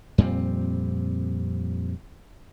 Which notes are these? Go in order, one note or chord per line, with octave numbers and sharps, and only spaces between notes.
F2 A#2 G3 C4